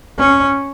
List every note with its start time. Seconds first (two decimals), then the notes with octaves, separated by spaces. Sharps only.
0.19 C#4